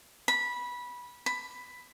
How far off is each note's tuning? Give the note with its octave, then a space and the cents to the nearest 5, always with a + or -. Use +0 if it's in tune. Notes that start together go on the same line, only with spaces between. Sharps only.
B5 -15
B5 +10